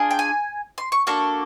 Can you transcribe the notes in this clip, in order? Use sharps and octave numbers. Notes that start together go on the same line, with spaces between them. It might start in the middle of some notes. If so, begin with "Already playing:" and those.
Already playing: D4 F4 G#4
G5
G#5
C6
C#6
A#3 D4 F#4 A4 C#6